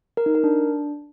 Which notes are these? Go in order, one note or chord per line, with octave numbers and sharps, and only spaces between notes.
A#4
D#4
A#4
D4